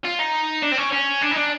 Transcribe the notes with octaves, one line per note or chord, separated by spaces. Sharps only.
F4
D#4
D4
C4
C#4
C#4
D4
D#4
D4